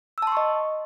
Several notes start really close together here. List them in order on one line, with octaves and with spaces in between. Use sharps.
E6 A5 C6 C#6 D#5